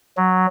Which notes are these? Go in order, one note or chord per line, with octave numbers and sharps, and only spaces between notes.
F#3